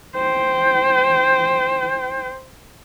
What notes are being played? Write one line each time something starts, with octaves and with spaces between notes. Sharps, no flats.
C5 G5